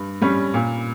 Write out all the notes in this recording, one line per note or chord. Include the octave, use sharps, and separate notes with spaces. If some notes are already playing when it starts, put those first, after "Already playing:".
Already playing: G2
G3 C#4
A#2